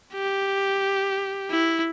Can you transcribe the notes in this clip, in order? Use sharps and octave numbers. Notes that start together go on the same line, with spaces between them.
G4
E4